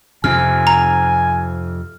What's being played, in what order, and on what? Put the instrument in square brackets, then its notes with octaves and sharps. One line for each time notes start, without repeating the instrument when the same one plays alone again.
[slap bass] F2 C3 [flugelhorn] G#5 [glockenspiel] F6
[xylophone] A#5